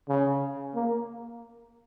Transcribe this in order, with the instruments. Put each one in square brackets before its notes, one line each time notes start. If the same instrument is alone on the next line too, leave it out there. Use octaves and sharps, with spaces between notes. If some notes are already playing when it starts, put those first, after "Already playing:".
[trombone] C#3
A#3